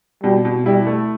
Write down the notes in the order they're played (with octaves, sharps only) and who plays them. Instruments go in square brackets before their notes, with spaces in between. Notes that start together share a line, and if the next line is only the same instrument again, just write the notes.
[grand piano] B2 [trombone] G3
[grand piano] B2
[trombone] G3 [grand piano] E4
[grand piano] A3